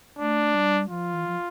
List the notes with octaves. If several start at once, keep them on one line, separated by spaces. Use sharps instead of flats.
A3 D4
G3
F3 F4
E3
F3